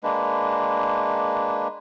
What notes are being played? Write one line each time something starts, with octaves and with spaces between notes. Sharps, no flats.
G#3 A#3 D4 B4